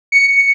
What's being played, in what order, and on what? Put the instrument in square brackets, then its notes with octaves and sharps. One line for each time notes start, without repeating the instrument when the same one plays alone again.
[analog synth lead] C#7